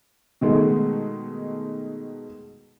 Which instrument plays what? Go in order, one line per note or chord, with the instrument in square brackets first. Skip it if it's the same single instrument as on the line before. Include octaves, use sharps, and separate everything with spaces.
[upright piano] B2 D#3 G#3 A3